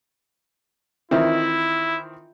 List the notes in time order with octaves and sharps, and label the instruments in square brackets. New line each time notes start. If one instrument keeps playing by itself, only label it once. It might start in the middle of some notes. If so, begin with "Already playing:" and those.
[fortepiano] D#3 E3 C4 [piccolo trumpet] E4 [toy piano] F4 D#5 E5